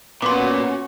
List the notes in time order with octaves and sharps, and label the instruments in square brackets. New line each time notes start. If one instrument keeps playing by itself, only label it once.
[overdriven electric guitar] A#2 [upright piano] B3 [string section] C#4 F#4 [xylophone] C6 D6